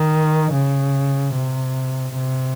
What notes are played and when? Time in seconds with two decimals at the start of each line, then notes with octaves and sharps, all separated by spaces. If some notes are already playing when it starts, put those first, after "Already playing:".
Already playing: D#3
0.52 C#3
1.34 C3
2.16 C3